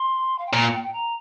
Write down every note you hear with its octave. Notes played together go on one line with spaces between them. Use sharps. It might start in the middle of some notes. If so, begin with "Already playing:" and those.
Already playing: C6
F5
G5
A#2 A#5
G5
G5
A#5